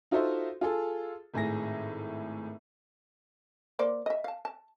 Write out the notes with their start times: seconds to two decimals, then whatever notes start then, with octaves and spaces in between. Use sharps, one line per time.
0.11 D#4 F4 F#4 A4 C5 E5
0.61 F4 G#4 A4
1.34 G#1 A2 G#4 A#6
3.79 A#3 C5 D5
4.06 D#5 E5
4.24 F5 A5
4.45 A5